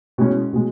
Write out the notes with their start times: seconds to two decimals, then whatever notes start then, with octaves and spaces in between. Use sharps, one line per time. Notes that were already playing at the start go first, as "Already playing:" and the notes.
0.18 B2 G#3 C#4
0.53 B2 G#3